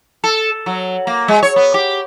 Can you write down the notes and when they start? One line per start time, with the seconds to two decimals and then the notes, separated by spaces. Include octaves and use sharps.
0.24 A4
0.66 F#3
1.07 A#3
1.28 G#3
1.43 C#5
1.56 B3
1.74 G4